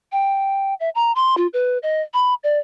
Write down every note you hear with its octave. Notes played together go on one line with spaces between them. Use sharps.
G5
E5
A#5
C6
F4
B4
D#5
B5
D5